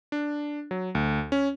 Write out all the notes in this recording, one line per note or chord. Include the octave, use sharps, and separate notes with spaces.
D4
F#3
D2
C#4